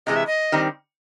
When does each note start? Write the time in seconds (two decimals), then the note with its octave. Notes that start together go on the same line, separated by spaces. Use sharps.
0.06 C3 E3 G#3 D#5
0.16 E5
0.27 D#5
0.52 D#3 G3 C4 D#4